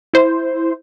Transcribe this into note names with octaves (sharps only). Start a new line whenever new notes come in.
E4 C5